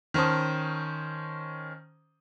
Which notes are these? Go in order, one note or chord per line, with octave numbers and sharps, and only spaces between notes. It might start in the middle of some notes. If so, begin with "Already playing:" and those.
D#3 C#4 C5 A5 D#6